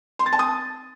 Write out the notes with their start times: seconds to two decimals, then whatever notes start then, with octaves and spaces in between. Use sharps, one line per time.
0.19 C6
0.26 A6
0.33 A5
0.39 D#6